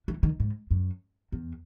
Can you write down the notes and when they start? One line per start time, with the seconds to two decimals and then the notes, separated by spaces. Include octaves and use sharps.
0.08 E3
0.23 D#3
0.40 G#2
0.71 F#2
1.32 E2